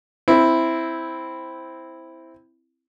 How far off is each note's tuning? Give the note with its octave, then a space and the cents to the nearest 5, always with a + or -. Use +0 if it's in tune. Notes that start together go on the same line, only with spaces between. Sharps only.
C4 +0 E4 +0